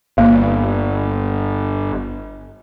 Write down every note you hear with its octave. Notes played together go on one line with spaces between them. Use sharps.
G1 A#3